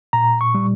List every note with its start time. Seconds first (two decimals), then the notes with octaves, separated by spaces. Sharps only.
0.13 A#2 A#5
0.41 C#6
0.55 G3